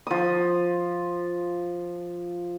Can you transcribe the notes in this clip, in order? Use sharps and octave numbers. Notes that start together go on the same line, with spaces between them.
F3 D#6